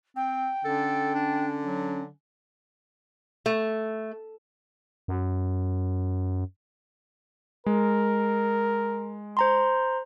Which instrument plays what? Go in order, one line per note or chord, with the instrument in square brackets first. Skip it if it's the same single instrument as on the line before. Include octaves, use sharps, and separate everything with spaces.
[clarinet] C4 [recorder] G5
[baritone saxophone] D3 [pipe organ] C#4 [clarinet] A4
[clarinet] D4
F#3
[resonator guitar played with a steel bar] A3
[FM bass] F#2
[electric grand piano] G#3 [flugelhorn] A#4
[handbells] C5 A#5 C6